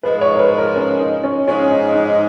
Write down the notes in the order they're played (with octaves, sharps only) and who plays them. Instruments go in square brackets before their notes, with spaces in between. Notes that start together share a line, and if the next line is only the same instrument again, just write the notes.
[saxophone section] G#2 F3 G#3 [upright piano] B4
[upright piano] C#5
A#4
B4
A#4
C#4
D#4
C#4
[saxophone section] G#2 F3 G#3 [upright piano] C#4
[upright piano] D#4
D#4